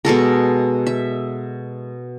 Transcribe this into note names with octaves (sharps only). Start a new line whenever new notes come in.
B2 G#3 A4 A#4
E5